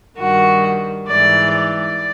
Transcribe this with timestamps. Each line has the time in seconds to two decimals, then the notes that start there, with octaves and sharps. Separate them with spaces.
0.18 G2 D#3 F#4
1.08 G#2 E3 D5
1.53 D5